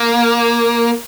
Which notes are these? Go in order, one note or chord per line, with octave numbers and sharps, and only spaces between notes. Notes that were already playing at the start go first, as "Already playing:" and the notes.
Already playing: A#3